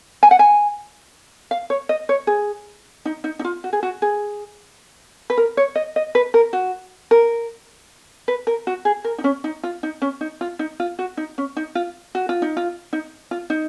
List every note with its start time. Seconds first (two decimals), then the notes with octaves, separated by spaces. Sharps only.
0.23 G#5
0.31 F#5
0.39 G#5
1.51 F5
1.70 C#5
1.89 D#5
2.09 C#5
2.27 G#4
3.05 D#4
3.24 D#4
3.39 D#4
3.45 F4
3.64 F#4
3.73 G#4
3.83 F#4
4.02 G#4
5.30 B4
5.37 A#4
5.57 C#5
5.76 D#5
5.96 D#5
6.15 B4
6.34 A#4
6.53 F#4
7.11 A#4
8.28 B4
8.47 A#4
8.67 F#4
8.85 G#4
9.04 A#4
9.18 D#4
9.24 C#4
9.44 D#4
9.63 F4
9.83 D#4
10.02 C#4
10.21 D#4
10.41 F4
10.59 D#4
10.80 F4
10.99 F#4
11.17 D#4
11.38 C#4
11.57 D#4
11.75 F4
12.15 F#4
12.29 F4
12.42 D#4
12.57 F4
12.93 D#4
13.31 F4
13.50 D#4